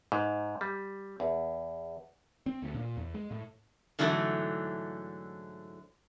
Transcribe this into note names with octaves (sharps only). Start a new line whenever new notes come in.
G#2
G3
E2
C4
D2
A#2
E2
G#3
A2
G#2 D3 E3 F#3 A3